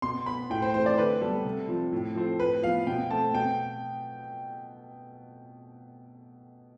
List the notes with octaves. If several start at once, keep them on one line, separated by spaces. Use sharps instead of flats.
B2 C6
B3 B5
A2 G5
C5
E3 A3 C4 C5
D5
D3 B4
G3 B3 A4
C3
F3 C4
A2
F3 A3 C4
A2 B4
F3 B3 F5
B2 G5
A3 C4 A5
B2 G5